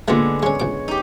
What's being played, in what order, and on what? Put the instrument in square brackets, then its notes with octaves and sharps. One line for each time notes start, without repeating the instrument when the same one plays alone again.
[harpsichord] A#2 A3 [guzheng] D3 G#3 B3
[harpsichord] G#3 C#4 [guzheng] C#5
[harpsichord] C#2 D6
[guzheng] D#4 G4